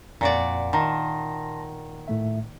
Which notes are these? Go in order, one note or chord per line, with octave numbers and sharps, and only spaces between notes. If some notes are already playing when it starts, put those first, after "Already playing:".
F2 A#2 F#4 D5
D#3 A5 C6 A#6
A2 A3 E5